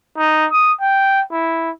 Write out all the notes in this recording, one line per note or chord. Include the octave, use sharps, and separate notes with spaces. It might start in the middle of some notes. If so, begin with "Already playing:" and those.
D#4
D#6
G5
E4